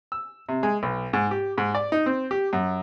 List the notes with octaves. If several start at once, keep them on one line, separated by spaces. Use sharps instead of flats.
E6
C3
G#3
B1
G#2
G4
G#2
D5
D#4
C4
G4
F#2